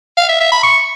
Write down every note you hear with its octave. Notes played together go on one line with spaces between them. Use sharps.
F5
E5
E5
B5
C#6